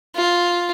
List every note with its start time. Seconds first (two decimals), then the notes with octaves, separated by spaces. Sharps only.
0.16 F4